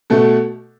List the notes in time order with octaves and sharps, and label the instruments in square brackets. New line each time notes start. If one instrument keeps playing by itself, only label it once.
[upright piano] B2 A3 F#4 A4